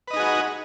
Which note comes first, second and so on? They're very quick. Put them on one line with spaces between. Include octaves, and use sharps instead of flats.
B4 D#5 D#4 G#4 F#4